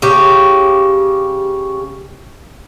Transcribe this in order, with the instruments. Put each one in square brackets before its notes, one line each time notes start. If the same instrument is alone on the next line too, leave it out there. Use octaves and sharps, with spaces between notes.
[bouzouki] C#3 G4